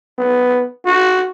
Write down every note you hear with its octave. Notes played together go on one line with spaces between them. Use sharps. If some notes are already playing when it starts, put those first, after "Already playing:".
B3
F#4